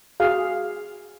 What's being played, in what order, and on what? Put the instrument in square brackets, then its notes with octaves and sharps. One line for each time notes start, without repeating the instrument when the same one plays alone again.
[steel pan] F#4 G#4 F5